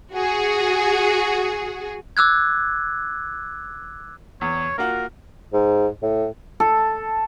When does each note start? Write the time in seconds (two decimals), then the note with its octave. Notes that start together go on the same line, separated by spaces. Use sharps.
0.15 F#4 G#4
2.17 D6 E6 F#6 G#6
4.41 E2 C#5
4.78 A#3 F4 F#4 A#4
5.53 G#2
6.02 A2
6.60 A4